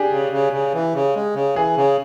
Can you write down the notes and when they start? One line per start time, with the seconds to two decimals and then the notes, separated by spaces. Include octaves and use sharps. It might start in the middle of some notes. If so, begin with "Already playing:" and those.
Already playing: D4 G4 G#4
0.11 C#3
0.32 C#3
0.53 C#3
0.74 E3
0.94 C#3
1.15 G#3
1.35 C#3
1.56 E3 G#4
1.77 C#3